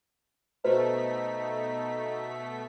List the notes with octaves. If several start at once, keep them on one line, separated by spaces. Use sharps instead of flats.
B2 A3 D#4 F#4 B4 C5 B6